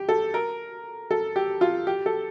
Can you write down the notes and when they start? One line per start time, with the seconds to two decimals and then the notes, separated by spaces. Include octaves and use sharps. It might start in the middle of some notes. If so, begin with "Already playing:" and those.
Already playing: G4
0.09 A4
0.34 A#4
1.11 A4
1.36 G4
1.61 F4
1.87 G4
2.06 A4